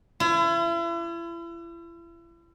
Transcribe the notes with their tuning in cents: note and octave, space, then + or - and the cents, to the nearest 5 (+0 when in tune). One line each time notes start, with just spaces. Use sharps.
E4 +40